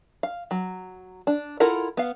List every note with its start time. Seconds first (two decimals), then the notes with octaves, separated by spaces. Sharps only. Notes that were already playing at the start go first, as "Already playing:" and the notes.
0.23 F5
0.51 F#3
1.27 D4
1.60 E4 F4 A4 A#4 F#5
1.97 B3 F5